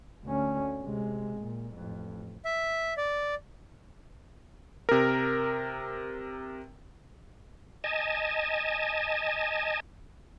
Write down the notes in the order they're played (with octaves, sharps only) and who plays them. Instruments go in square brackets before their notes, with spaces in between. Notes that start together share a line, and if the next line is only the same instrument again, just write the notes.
[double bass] D2 C#4
C3 G#3
A#2
A1 F2
[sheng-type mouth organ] E5
D5
[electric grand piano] C3 A#4
[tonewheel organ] D#5 G#5 A5